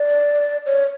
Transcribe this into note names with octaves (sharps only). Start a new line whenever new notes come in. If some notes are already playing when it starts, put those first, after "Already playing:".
Already playing: D5
C#5